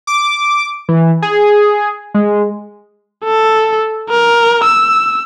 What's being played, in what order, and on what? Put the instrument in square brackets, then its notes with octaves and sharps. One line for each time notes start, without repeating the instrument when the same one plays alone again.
[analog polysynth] D6
E3
G#4
G#3
[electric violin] A4
A#4
E6